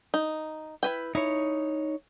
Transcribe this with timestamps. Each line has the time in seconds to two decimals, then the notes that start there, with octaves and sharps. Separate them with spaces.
0.14 D#4
0.83 E4 B4 G5
1.15 D#4 E4 C#5